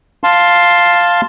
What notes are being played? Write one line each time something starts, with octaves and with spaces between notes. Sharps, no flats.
F5 A5 C6